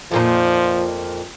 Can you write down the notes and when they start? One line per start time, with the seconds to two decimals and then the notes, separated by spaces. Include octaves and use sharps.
0.11 F2 A#2 F3 D#4